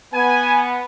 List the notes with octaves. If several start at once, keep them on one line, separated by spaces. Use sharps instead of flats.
B3 G#5